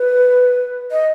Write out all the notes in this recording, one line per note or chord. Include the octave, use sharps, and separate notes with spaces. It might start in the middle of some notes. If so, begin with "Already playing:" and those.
Already playing: B4
D#5